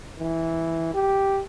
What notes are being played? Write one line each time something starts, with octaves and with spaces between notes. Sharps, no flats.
E3
G4